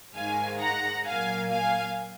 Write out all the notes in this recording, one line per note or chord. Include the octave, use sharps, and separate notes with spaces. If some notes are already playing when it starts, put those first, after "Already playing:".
G#2 D#3 G#3 F5 G#5
F#5 A#5
A#2 F#3 A#3 F5 G#5
F5 G#5